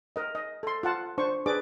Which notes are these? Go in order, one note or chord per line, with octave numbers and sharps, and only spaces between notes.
A#4 D#5
D#5
A4 C6
F4 F#5 A5
D4 C5 C#6
D4 G#4 B4 D5 D6